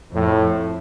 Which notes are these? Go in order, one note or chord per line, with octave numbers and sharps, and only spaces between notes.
F2 A2